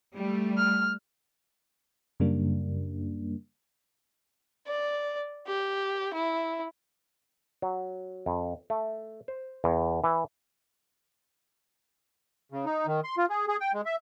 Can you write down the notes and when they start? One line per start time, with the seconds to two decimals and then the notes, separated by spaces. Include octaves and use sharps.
0.15 G3 A3
0.57 F6
2.20 F#2 C#3 G3 A#3 D4
4.67 D5
5.47 G4
6.14 E4
7.62 F#3
8.26 F2
8.70 A3
9.28 C5
9.64 E2
10.04 E3
12.52 C#3
12.65 D#4
12.87 D#3
13.04 C6
13.18 F4
13.30 G#4
13.48 G#4
13.60 G5
13.74 G#3
13.86 E5